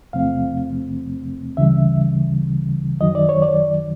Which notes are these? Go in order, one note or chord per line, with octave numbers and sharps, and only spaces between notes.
E2 C3 F3 A3 C4 F5
D2 C#3 E3 G3 E5
F#2 D#3 F#3 D#5
D5
C#5
D5